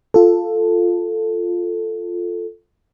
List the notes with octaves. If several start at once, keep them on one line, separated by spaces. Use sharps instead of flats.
F4 A4